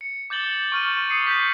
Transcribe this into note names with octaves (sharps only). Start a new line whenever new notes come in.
C#7
D6 G6 A6 F#7 G7
C#6 F6 D#7
D#6 C7 C#7 D#7
G6 B6